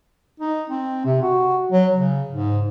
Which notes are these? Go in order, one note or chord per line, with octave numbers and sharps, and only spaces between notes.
D#4
C4
C3
F#4
F#3
C#3
G#2